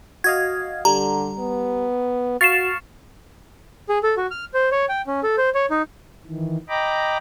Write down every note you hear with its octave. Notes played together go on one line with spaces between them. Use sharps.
F#4 D#5 F5 G#6
D3 G3 A#5
B3
F#4 F5 C#6 F6 A6 C7 E7
G#4
A4
F#4
F6
C5
C#5
G5
C#4
A4
C5
C#5
D#4
D#3 E3
D#5 G5 A#5 B5 D6